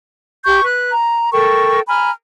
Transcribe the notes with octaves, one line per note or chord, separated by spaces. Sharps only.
G4 C#6 G6
B4 F#6
A#5
A4 A#4 G5 C#6
G#5 A#5 B5 F6